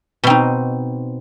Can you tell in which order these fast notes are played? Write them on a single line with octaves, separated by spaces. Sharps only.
B2 C4 D#4